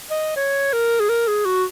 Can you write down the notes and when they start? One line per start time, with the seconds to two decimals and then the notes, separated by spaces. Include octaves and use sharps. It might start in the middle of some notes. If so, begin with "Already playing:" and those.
0.11 D#5
0.36 C#5
0.73 A#4
1.00 G#4
1.09 A#4
1.28 G#4
1.45 F#4